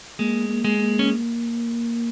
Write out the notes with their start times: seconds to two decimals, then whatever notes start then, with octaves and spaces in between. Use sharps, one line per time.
0.19 G#3 A#3
0.49 A#3
0.65 G#3
0.79 A#3
0.99 C#4